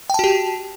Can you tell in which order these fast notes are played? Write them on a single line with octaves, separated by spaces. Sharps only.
G5 A5 F#4 G4